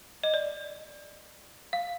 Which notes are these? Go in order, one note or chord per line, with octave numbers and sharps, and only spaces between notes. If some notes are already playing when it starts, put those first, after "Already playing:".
D#5
D5
F5